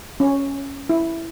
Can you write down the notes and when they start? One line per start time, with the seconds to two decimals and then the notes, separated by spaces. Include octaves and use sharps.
0.20 C#4
0.89 E4